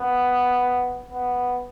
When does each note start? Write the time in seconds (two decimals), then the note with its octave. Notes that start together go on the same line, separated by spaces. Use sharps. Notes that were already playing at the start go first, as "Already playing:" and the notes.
Already playing: B3
1.10 B3